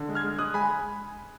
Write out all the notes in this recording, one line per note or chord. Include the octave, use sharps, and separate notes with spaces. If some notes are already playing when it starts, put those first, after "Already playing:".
Already playing: D3
G#3
F6 G#6
G#3
G#3 D#6 F#6
G#3 G#5 B5